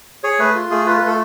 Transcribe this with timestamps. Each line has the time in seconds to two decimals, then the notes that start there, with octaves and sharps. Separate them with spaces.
0.24 G#4 C#5
0.39 A3 B4
0.55 F4
0.71 A3 G#4
0.86 F4 B4
0.97 A3 B4
1.07 A4